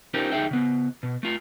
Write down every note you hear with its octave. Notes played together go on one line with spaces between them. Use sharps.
C#4 D#4 F4 G4 A#4 C5
D2 D#4 G#4 E5 G5
C#3 B3
B2
A3 F4